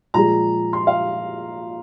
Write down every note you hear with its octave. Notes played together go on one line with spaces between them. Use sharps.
A#2 F3 G#3 A#5
C6
F5